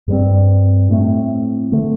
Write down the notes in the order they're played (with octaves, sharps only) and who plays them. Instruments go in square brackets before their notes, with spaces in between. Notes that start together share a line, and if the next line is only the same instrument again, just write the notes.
[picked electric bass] G2 G3 C4
A2 A3 C4
D3 A3